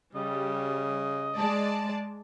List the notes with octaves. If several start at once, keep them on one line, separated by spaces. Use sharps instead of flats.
C#3 G3 D#5
G#3 D5 A5